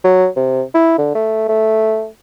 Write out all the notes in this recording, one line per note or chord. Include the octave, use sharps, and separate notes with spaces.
F#3
C3
E4
D3
A3
A3